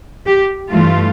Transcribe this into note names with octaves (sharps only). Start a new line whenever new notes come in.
G4
G2 E3 A3 F4